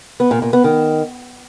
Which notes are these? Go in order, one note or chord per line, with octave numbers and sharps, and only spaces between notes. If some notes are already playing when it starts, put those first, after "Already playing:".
B3
A#2
A#2
B3
D#3